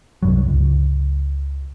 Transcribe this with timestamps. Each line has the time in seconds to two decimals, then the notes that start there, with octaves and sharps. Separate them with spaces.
0.23 C2 G2 F#3
0.48 C#2